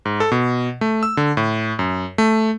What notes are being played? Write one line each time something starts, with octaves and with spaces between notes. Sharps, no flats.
G#2
A4
B2
A3
E6
D3
A2
F#2
A3